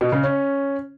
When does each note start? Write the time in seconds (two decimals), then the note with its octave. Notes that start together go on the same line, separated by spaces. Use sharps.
0.01 B2
0.12 C#3
0.24 C#4